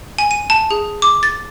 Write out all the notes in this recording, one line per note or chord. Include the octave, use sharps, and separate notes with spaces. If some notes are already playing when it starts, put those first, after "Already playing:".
G#5
D#7
A5
G#4
D6
A6